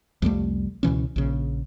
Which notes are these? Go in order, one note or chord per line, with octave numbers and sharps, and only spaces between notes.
C2 F2 G3 A3
C#2 B2 E3 C#4
A#1 C#3